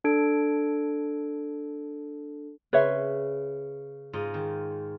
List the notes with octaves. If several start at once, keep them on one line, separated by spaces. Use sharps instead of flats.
D4 A4 G#6 D7
C#3 B4 C#5 E5 C6
G#2 F4 D#5
D#3